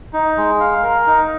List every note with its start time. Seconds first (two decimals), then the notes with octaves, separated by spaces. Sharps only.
0.13 D#4
0.37 G#3
0.60 F5
0.83 A#4
1.07 D#4